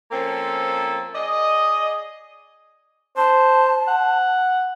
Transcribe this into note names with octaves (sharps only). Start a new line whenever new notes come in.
F3 A#3 C4 C#4 A4
G#4 D5 D#5
C5 A5
F#5